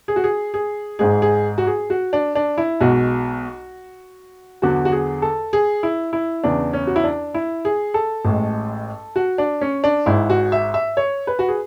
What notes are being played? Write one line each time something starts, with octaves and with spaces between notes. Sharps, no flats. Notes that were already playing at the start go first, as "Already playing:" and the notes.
G#4
F#4
G#4
G#4
G#1 G#2 G#3 G#4
G#4
F#4
G#4
F#4
D4
D4
E4
B1 B2 G#3 F#4
E2 D3 F#3 F#4
F#4
G#4
A4
G#4
E4
E4
E2 C#3 E3 D4
C#4
F#4
E4
D4
E4
G#4
A4
A1 A2 G#3
F#4
D4
C#4
D4
G#1 G#2 G#3 E4
F#4
E5
E5
C#5
B4
F#4
G#4